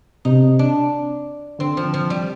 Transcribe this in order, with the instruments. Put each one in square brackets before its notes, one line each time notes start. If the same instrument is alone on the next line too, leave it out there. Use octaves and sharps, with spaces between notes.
[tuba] C3 [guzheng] D#4
[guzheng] D4
[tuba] D3 [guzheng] C4
[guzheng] F3
F3
G3